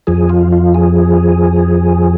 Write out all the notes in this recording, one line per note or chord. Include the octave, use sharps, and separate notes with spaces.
F2 F3 G#4
F4
F4
G#4